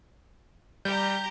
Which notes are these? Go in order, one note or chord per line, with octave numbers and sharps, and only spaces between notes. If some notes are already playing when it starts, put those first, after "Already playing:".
G3 G4 A#5 G6